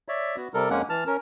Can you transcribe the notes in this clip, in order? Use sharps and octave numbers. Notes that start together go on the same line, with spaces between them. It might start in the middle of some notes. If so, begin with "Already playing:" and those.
C#5 D5 E5
B3 F#4
C3 G3 A4 A#4
F2 G#3 A#3 C#4 F#5
E3 A5 F6
C#4 A#4